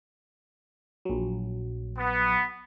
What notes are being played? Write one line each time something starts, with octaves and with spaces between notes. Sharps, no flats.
A#1 F#3
B3